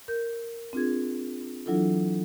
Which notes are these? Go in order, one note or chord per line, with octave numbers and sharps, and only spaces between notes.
A#4 G6
C4 D4 F4 G#4 G#6
E3 F#3 D4 E4 F4 A4